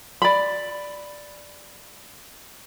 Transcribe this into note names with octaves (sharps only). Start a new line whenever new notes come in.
D5 B5